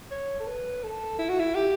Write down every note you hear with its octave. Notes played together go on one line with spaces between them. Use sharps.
C#5
A4
B4
A4
E4
F#4
E4
G4